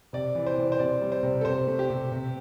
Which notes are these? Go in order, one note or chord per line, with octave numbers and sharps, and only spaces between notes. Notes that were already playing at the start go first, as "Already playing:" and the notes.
C3 D5
E3
C5
C3
C5
C3 D5
G3
C5
C3
A4
C3 C5
A3
G4
C3
C3